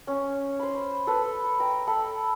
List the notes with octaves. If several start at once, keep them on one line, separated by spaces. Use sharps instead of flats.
C#4
C5 B5
A4 B4
G5 A#5
A4 B5